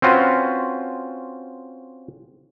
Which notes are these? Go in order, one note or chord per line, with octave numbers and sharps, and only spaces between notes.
C4 C#4 F4 F#4 B4